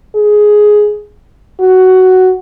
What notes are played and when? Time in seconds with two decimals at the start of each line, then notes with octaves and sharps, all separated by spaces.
0.15 G#4
1.60 F#4